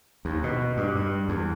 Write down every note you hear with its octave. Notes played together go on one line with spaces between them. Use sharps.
D#2
B2
G2
G2
E2